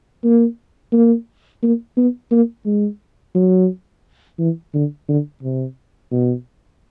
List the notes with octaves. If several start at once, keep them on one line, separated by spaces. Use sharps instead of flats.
A#3
A#3
A#3
B3
A#3
G#3
F#3
E3
D3
D3
C3
B2